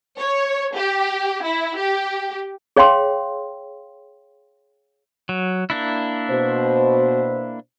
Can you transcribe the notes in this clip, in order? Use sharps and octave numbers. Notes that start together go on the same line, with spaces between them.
C#5
G4
E4
G4
G#4 C#5 F5 G5 C6
F#3
A#3 D4 E4
B2 C5